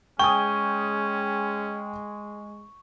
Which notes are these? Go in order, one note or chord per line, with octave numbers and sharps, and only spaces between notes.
G#3 C#4 G5 G#5 C#6 D#6